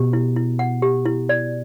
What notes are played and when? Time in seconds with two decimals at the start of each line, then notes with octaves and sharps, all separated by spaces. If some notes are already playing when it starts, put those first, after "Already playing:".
Already playing: B2 G4
0.13 E4
0.36 E4
0.59 F#5
0.82 G4
1.05 E4
1.29 D5